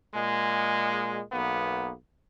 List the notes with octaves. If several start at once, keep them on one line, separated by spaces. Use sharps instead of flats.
A#2 G#3
B1 A#3 B3